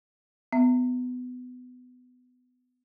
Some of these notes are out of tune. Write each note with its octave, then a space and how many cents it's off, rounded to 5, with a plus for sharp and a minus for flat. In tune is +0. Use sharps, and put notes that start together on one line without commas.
B3 +20 E5 +10